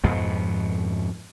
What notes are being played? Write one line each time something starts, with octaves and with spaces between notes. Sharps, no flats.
F2 G#2 B2 B3